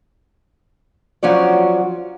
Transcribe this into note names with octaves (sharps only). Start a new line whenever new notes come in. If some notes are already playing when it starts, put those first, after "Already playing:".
F3 F#3 C#4 F#4 D5